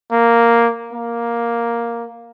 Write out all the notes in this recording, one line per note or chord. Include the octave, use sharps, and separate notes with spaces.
A#3
A#3